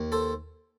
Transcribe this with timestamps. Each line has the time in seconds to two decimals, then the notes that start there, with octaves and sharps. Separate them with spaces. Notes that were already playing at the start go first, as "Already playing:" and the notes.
Already playing: D#2
0.12 A4 C5